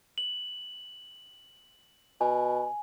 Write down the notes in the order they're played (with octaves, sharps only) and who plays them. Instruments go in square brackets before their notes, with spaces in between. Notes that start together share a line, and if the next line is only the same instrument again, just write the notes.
[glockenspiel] F#7
[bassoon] B2 [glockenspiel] G#5